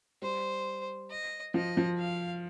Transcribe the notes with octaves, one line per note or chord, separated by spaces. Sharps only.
G3 C5
D#5
F3 D#5
F3
F5